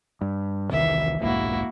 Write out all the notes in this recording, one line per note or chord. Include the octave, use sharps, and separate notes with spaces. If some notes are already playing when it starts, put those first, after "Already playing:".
G2
E1 C2 D#3 E3 E5
D#1 B1 G#2 A#3 E4 F#4